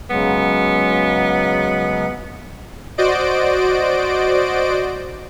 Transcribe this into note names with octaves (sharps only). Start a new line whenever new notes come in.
C#3 F#3 G#3 B3
F#4 C5 D5 D#5 D7